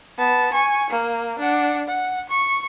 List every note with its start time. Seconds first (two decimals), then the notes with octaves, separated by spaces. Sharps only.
0.19 B3 A5
0.53 G#5 C#6
0.90 A#3
1.39 D4 F#5
1.88 F#5
2.29 C#6